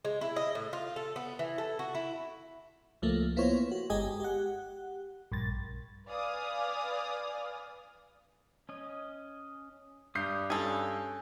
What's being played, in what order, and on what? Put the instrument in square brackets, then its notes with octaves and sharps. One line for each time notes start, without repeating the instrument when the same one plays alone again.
[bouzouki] G#3
E4
D#5
A2
F4
A4
B3
E3
A4
F#4
E4
[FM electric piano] C#2 F3 A3 A#3
A#3 B3 E4 F4 C5 C#5
F#4
G1 G#3 G4 G#4 D#5 G#5
G4 F#5
A#1 G2 A6
[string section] B4 D5 F5 G#5 D#6 F6
[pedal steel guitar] C#4 D#5
[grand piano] G2 G6 C7 [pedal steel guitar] D5 D#6
[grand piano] G2 [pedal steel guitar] C#4 [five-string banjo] G#4 A4 [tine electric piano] G#5